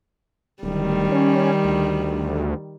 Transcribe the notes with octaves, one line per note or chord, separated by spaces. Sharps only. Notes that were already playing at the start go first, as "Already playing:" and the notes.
D1 D#3 G3
C#4
D2